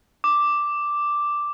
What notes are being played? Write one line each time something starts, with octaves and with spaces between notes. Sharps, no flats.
D6